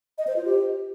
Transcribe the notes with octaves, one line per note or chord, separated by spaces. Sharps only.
D#5
C5
F4
G4